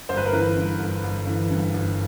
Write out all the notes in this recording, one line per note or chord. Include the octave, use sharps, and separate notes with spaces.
G1 C5
B4
A#4
E3 B4
G2
G1
G1
E3
G2
G1